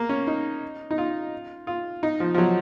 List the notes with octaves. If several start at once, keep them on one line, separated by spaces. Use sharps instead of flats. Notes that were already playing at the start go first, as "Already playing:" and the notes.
Already playing: A#3
C#4
D#4
D#4
F4
F4
D#4
F3
F3
F#3